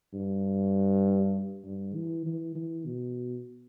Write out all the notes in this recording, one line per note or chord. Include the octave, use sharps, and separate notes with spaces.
G2
G2
E3
E3
E3
B2